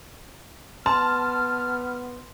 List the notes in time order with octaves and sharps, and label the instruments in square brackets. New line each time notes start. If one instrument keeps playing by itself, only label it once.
[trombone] B3 [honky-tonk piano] A5 [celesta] C6 [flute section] F6